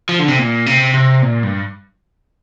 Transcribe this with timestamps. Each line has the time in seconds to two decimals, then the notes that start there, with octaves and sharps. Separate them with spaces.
0.09 F3
0.19 D3
0.28 C3
0.39 A#2
0.66 C3
0.94 C3
1.22 A#2
1.43 G2